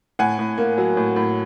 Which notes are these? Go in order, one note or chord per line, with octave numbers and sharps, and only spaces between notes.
A2 F#5 G#5
A2
A#3
F#3
A2
A2